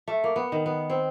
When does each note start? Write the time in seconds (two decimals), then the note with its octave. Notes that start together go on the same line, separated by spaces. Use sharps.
0.08 A3
0.24 A#3
0.36 B3
0.52 D#3
0.66 B3
0.90 C4